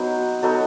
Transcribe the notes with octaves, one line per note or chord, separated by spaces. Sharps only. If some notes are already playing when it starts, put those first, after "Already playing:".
Already playing: F#3 B3 D#4 C5
F#3 B3 D#4 A4